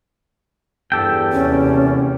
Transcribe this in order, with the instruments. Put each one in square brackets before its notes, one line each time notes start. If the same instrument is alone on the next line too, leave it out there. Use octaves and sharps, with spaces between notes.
[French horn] E2 [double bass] G2 [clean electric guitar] G4 A4 G5
[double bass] D#2 C3 [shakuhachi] C#4